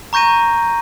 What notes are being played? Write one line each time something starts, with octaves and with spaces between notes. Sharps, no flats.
A#5 C#6 G6 A#6 D#7